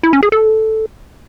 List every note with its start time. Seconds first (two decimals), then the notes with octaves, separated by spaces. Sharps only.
0.03 E4
0.13 C#4
0.23 G#4
0.32 A4